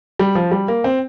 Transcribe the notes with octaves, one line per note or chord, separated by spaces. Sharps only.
G3
F3
G3
A#3
C4